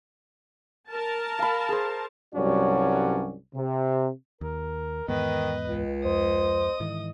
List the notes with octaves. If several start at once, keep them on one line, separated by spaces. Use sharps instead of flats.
A#4 A5
F5 B5
G#4 C5
C2 G2 F#3 C#4 F#4 D5
C3
D#2 A#4
E2 G#2 D#3 B3 B4 D#5
C#2
F2 C5 D#5 D#6
G#2 D#3 E3